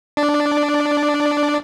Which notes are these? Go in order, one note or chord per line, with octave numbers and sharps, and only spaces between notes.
D4 D5